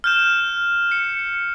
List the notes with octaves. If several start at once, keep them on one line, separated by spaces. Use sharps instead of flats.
F6 G6 E7
C#7